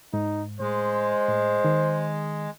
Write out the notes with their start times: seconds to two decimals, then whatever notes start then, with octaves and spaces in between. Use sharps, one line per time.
0.14 G#2 D#4
0.60 A2 G#3 C5
1.28 A2
1.65 D#3